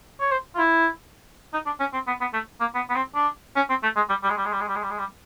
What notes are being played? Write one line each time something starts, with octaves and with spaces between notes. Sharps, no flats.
C#5
C5
F4
E4
D#4
D4
C#4
C4
B3
B3
A3
A#3
B3
B3
C4
D4
C#4
C4
A3
G#3
G3
G3
G#3
G3
G#3
G3
G#3
G3
G#3
G3
G#3
G3